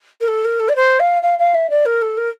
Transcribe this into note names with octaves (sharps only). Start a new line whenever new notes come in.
A#4
A4
A#4
A4
D5
C5
F5
F5
F5
E5
D5
A#4
A4
A#4